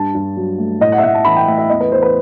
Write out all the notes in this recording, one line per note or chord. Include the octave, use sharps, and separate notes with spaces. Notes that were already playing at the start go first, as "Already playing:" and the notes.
Already playing: G2 A5
G2
F#3
A3
A2 D#5
F#5
E5
A2 F#5
A5
E3 B5
G5
A3 E5
E5
E2 D#5
B4
E2 C5
B4